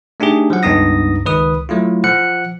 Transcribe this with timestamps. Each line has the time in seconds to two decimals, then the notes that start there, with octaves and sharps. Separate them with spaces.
0.20 A3 D4 D#4 G4 G#4
0.50 F3 F#3 F#5
0.63 C#2 G2 B3 D#4 D#6 A#6
1.25 C#2 D#3 B4 D#6
1.69 F#3 A3 E4 F4
2.04 F3 F#5 F#6 C#7